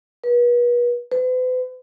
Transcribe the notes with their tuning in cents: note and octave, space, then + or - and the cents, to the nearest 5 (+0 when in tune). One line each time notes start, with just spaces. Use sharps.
B4 -40
B4 +45